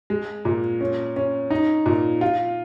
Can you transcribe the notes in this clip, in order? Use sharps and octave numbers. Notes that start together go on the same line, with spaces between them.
G#3
A#2
C#4
C#4
D#4
A#2
F4